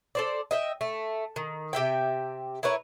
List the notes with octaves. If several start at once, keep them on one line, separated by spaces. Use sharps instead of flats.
A4 C5 D5
D#5 E5 G5
A3
D#3
C3 G4 E5 G5
E4 A#4 B4 C#5